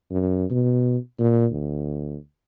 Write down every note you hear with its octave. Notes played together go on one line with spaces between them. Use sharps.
F#2
B2
A#2
D2